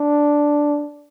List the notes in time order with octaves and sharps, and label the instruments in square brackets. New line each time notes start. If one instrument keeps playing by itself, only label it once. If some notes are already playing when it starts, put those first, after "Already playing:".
Already playing: [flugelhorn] D4